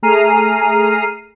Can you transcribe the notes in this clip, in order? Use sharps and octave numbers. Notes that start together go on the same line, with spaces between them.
A3 G#4 A#5 F6 C7 D#7